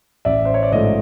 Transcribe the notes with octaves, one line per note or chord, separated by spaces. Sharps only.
A1 D5 E5
C5
C#5
D5
G#2 F3 A3 C#5 D#5